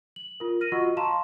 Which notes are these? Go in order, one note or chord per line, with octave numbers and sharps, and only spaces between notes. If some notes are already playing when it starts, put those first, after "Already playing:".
F#7
F4 A#4
F6 A#6 D#7
F4 F#4 D#5 F#5 C#6 E6
F5 A5 A#5 C6 C#6 E7